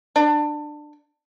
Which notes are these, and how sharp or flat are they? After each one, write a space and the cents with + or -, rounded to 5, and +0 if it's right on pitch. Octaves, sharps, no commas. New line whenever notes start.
D4 +20